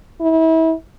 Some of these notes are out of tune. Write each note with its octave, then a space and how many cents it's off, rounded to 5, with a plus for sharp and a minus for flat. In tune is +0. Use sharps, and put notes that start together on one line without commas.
E4 -30